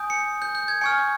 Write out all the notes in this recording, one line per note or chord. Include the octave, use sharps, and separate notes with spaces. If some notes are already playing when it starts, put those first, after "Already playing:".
Already playing: G#5 D#6 G6
C#7
G6
G6
G#6
G#5 C#6 F6 C#7